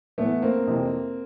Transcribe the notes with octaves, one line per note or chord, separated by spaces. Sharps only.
A2 E3 A3 B3
A#3 C4
F2 C3 E3